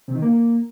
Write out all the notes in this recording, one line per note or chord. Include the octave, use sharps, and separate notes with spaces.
C3
D#3
A#3